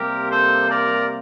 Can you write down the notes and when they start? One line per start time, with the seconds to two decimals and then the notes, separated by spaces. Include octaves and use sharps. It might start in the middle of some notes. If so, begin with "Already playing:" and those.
Already playing: C3 G3 A#3 G4 A#4
0.30 A4 C5
0.69 A#4 D5